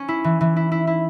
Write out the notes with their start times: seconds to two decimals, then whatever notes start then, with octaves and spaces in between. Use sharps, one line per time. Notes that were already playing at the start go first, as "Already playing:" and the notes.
Already playing: C#4
0.08 E4
0.24 E3
0.41 E3
0.56 E4
0.72 E4
0.87 E4